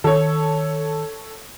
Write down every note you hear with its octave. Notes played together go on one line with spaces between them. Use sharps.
D#3 A4 C#5